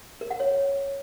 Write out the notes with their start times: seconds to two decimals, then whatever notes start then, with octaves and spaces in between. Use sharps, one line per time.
0.21 A#4
0.31 F#5
0.40 C#5